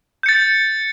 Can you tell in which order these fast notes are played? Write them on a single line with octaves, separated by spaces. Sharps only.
G6 C#7 A6